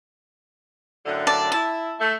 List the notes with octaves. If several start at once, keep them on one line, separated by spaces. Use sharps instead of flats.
F#2 A2 D3
D5 A5
E4 A5
A3